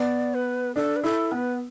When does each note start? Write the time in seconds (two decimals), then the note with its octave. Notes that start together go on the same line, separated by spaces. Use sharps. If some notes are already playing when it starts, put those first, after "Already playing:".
Already playing: B3 D5
0.34 B4
0.75 D4 A4
0.96 B4
1.03 E4 A4
1.32 B3 B4